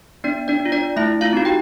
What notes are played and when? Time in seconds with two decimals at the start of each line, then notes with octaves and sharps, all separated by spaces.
0.24 B3 D4 D5
0.48 D4 D5
0.60 D4
0.65 F4
0.72 D4 D5
0.96 A3 E4 E5
1.21 F4 F5
1.33 C4 D#4 F#4
1.45 G4 G5